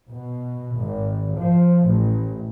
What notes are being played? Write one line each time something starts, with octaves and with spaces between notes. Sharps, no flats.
B2
G#1
F3
A1